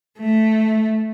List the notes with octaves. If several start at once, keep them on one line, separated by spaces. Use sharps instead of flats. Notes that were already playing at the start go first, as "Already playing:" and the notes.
A3